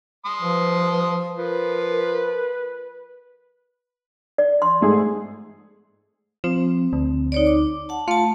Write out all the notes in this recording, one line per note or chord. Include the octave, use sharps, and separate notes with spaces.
C6 D#6
F3 B4
F3 A#4 B4
D5
C6
G#2 A3 G#4
F3 C4
D2
D#4 C#5 D5
D6
F#5 A5
A3 F4 A5